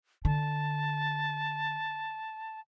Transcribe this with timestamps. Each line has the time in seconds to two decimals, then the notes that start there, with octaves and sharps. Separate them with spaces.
0.25 D3 A5